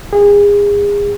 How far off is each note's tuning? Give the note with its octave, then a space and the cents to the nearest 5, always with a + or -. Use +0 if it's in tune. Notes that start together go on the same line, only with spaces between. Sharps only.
G#4 -30